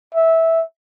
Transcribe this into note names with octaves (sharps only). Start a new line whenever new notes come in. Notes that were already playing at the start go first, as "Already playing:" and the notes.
E5